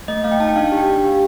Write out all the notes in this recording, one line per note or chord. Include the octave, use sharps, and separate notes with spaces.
A3 D#5
A3 F5
G5
D#4 A5
G5
D4 F5
F5
G4
G5
D4
G4